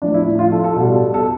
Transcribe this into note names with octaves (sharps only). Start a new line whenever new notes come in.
A2 F3 D4
E4
F4
A4
A4
B2 G3
A4